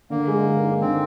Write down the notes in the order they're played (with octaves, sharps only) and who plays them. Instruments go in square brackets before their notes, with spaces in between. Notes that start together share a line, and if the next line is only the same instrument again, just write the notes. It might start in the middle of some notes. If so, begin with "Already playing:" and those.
[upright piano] D3 [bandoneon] A#3
[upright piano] G#3
A#4
D#4
[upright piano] D3 [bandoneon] C4